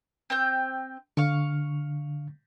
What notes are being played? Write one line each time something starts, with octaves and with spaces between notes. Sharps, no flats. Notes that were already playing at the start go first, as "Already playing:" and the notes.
C4 G5 G6
D3 F5 C#6